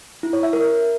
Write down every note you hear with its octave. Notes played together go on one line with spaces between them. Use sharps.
E4
C#5
E5
A#4